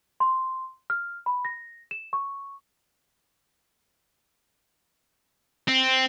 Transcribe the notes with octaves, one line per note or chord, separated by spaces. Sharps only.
C6
F6
B5
A#6
E7
C#6
C4